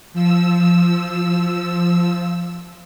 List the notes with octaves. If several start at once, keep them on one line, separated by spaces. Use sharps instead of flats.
F3 E6